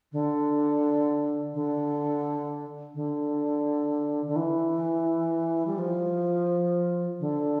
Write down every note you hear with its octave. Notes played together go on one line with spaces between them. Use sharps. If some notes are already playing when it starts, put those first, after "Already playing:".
D3
D3
D3
D3
E3
G3
F3
D3